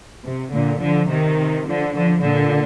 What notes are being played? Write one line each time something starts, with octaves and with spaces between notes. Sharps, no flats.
C3
A#2 D3
D3 F3
C3 D#3
D3 F3
D3 F3
A#2 D3